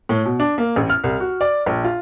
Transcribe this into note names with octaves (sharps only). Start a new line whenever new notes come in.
A2
B2
D4
A#3
A1
F6
C2
F#4
D5
A#1
F4